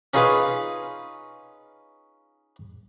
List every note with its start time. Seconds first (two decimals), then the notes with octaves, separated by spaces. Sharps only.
0.14 C#4 D#4 F4 G#4 B4 F5